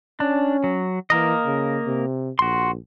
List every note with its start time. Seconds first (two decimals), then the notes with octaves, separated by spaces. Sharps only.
0.20 C#4 D4
0.64 F#3
1.10 E3 A#3 A#4 D#5
1.45 C#3
1.87 C3
2.39 A#1 F#4 C6